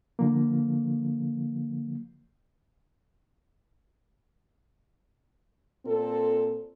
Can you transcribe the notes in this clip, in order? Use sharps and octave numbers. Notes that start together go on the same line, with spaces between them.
D3 F3 A#3
A#2 C4 A4